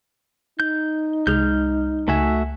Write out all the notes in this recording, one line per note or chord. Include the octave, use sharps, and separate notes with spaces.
D#4 G6
C2 G#3 F6 G6
C#2 A3 F#4 E5 G#5